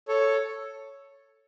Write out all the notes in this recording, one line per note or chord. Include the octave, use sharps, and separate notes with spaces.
A4 C#5